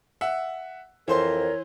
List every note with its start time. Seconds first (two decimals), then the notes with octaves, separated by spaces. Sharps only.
0.21 E5 F#5
1.08 F2 E3 A#4 C5 C#5 C6